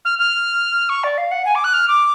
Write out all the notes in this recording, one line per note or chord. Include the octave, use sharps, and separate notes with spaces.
F6
F6
C#6
D5
F5
F#5
G#5
D6
F#6
F6
D6